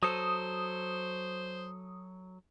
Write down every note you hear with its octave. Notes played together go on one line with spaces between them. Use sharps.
F#3 A4 C5 D#6